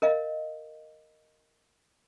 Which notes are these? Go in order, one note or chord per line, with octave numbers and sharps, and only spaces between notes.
A#4 D#5 F5